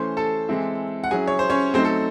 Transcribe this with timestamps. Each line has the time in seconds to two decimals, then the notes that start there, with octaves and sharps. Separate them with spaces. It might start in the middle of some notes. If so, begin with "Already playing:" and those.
Already playing: E3 A3 C#4 C5 C6
0.17 A4 A5
0.49 E3 G#3 C4 E4
1.04 F#5
1.11 F#3 C#4 E4 G#4 G#5
1.28 C#5
1.39 C5
1.50 C#4 C#5
1.74 F#3 A3 C4 D#4 C5
1.85 A4